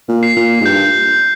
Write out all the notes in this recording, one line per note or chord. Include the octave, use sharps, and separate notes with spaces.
A#2
C7
A#2
G#2
G2 G6